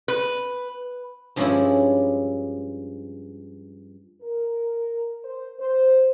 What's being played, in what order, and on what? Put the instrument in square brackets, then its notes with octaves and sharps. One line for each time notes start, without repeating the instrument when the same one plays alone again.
[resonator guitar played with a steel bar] B4
[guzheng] G2 F3 G#3 C#4 D4 E4
[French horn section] A#4
C5
C5